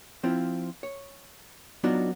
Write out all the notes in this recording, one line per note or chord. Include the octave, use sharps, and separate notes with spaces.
F3 C4 E4 F4
C#5
F#3 B3 D4 D#4 F4 F#4